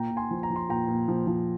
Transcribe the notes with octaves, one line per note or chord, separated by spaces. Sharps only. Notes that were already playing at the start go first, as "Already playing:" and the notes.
Already playing: A#2 G5 A#5
A#2
G#5 C6
F3
A#5
F3
C6
A#2 G5 A#5
A#2
F3
F3